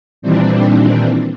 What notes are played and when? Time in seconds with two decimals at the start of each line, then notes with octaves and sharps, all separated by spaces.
0.22 A#2 D#3 E3 G3 C4 D4